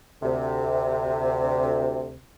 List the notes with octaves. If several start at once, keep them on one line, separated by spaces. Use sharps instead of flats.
D2 C3